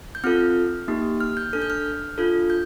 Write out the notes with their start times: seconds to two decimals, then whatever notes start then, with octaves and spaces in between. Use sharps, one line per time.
0.15 G6
0.24 C4 F4 A4 F6
0.88 A#3 D#4 G4
1.20 F6
1.37 G6
1.53 D4 A4 F6
1.62 G6
1.70 F6
2.18 D4 F4 A4
2.50 G6